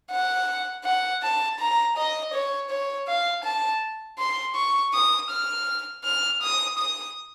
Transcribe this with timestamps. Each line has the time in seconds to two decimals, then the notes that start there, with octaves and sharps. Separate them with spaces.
0.11 F#5
0.84 F#5
1.22 A5
1.59 A#5
1.97 D#5
2.34 C#5
2.70 C#5
3.08 F5
3.44 A5
4.19 C6
4.55 C#6
4.93 D#6
5.30 F6
6.04 F6
6.42 D#6
6.78 D#6